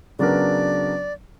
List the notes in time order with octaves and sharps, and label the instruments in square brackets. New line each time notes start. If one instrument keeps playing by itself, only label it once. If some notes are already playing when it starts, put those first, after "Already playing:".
[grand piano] C#3 F#3 B3 D4 A#4 [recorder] D5